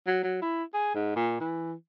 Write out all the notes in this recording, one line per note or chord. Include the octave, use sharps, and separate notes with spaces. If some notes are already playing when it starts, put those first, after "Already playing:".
F#3
F#3
E4
G#4
G#2
A#2
E3